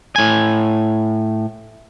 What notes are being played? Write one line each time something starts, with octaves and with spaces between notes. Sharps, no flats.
A2 G#5